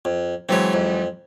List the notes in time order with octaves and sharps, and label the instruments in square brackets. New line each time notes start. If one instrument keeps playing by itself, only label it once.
[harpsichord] F2
[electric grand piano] E3 F#3 G#3 [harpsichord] C4 C#5
[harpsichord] F2